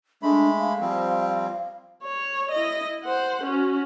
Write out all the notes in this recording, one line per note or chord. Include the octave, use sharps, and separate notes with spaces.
G#3 A3 D4 B5
F5
F3 G3 C4
C#5
E4 D#5
C5 F#5
C#4 F#4